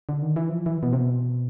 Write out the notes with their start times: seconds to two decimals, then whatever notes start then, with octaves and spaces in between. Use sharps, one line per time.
0.09 D3
0.22 D#3
0.36 E3
0.50 F3
0.66 E3
0.83 B2
0.93 C3
0.99 B2